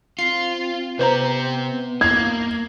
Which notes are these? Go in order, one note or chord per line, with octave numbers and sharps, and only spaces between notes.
C4 F4 C7
C3 B3 C4 B4 C5 A#5
A#3 G#6